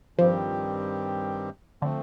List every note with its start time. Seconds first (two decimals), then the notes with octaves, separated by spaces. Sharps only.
0.18 G2 D#3 F3 G3 C4 G4
1.82 D3 F3 A3 C4